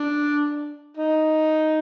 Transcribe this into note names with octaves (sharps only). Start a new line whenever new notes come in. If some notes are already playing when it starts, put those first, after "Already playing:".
Already playing: D4
D#4